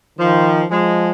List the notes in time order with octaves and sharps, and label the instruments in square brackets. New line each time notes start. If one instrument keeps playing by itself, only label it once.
[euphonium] D#3 [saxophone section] F3
[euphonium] F3 [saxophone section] G#3